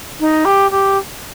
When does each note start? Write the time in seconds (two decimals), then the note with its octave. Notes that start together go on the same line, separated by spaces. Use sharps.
0.20 D#4
0.45 G4
0.70 G4